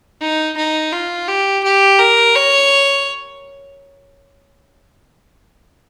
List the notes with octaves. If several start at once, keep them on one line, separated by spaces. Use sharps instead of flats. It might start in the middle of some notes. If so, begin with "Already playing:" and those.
D#4
D#4
F4
G4
G4
A#4
C#5